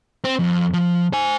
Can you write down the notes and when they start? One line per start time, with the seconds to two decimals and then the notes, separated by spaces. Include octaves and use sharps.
0.24 C4
0.39 F2
0.73 F3
1.13 C5 G#5